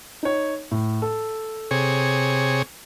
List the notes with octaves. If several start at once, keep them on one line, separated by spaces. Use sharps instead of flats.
D#4 C#5
A2
A4
C3 G#4 C#5